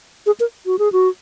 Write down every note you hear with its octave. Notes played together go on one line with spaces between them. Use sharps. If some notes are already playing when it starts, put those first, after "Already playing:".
G#4
A#4
F#4
G#4
F#4